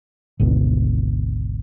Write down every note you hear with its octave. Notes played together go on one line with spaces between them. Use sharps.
G#1 D2 B2